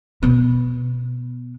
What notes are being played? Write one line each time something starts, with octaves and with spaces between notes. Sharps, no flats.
B2 B3